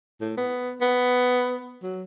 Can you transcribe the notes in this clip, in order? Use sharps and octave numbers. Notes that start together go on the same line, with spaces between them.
A2
B3
B3
F#3